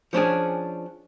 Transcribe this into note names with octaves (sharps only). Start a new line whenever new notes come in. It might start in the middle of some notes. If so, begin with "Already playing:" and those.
F3 C#4 D4 G#4